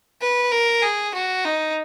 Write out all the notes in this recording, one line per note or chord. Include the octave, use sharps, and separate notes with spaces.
B4
A#4
G#4
F#4
D#4